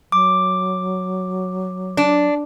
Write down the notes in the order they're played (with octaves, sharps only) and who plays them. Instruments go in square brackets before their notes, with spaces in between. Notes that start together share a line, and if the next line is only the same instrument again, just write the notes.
[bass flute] F#3 [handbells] D6
[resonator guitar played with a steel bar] D4